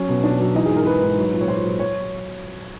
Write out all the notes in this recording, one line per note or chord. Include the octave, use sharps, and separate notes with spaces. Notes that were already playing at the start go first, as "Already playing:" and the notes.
Already playing: F#3 C#4
B2
B2 D4
F#3
E3 D#4
G#4
G#2
A#4
G#3 B4
G#2
F#3
A#2
C#5
A#2 C5
F#3
F#3 C#5